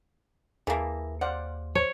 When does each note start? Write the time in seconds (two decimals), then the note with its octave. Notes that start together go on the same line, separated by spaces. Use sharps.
0.67 D#2 E3 A#3 G#4 E5 A5
1.21 C5 D5 F5 F#5
1.75 C#5